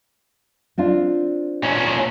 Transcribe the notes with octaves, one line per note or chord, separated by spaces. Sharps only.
C4 D4 F4
A#2 C#4